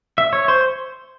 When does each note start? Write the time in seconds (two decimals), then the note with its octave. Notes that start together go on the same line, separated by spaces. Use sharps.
0.18 E5
0.33 C#5
0.48 C5